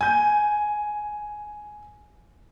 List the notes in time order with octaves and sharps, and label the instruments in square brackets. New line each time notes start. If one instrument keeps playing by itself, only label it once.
[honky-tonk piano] G#5 G6